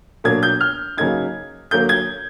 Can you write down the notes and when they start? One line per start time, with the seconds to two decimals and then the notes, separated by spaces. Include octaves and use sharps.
0.24 B2 F#3 A#3 D4 G#6
0.43 G6
0.61 F6
0.97 C#3 F#3 A#3 D#4 G#6
1.71 D3 F#3 A#3 G6
1.89 G#6